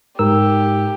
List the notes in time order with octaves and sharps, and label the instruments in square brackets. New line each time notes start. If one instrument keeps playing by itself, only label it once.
[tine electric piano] G#2 A#4 E6 [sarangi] G4